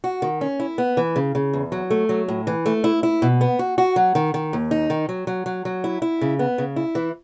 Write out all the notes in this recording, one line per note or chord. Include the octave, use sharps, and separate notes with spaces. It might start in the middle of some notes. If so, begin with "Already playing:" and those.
F#4
D#3
C#4
E4
B3
E3
C#3
C#3
E2
F#3
A3
F#3
A2
E3
A3
E4
E4
B2
B3
F#4
F#4
F#3
D#3
D#3
D#2
D#4
D#3
F#3
F#3
F#3
F#3
E4
E4
C#3
B3
C#3
E4
E3